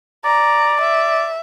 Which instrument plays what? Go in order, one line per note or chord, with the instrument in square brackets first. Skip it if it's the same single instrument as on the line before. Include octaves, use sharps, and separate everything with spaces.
[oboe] D5 [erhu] A#5
[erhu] E5